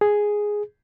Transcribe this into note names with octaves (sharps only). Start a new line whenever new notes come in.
G#4